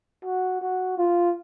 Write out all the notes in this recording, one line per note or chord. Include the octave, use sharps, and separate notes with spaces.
F#4
F#4
F4